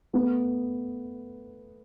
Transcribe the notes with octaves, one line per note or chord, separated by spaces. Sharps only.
A3 B3